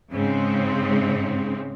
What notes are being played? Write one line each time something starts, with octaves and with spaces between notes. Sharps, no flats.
G#2 C#3 C4